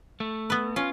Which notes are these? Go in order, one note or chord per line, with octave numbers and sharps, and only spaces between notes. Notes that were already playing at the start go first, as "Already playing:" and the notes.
A3
B3 B4
C#4 F4